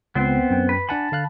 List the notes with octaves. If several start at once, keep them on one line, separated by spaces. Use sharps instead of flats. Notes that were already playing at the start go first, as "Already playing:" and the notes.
C#2 B3 C4 C5
F#2 G5
B4
D4 F#5 G#5 A5 B5
D3 F5 F#6